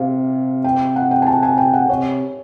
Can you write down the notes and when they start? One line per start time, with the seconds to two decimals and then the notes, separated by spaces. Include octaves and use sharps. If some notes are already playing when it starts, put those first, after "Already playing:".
Already playing: C3 F5
0.64 G5
0.96 F#5
1.11 G5
1.22 G#5
1.26 A5
1.43 G#5
1.58 G5
1.74 F#5
1.89 C3 C#5